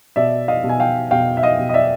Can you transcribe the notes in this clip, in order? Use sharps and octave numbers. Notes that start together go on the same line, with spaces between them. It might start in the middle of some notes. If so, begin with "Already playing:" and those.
B2 D5 E5
D#5 F5
B2
G#5
F5 G5
B2 F5 G5
E5
D#5 F5
B2
D#5
D5 E5